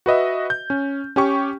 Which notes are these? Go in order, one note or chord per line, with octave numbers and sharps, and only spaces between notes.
F#4 B4 D#5 E5
G6
C#4
C#4 G4 C#6